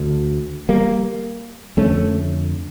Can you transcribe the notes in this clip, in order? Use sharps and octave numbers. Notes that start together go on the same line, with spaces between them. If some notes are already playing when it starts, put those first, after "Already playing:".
Already playing: D2 D3
G3 A#3
F2 D3 A3 C#4